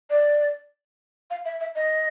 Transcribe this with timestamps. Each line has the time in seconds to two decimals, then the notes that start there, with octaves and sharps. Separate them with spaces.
0.10 D5
1.31 F5
1.45 E5
1.61 E5
1.75 D#5